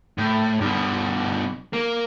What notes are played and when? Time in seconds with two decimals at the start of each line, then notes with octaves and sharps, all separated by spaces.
0.18 A2
0.61 G2 B2
1.73 A#3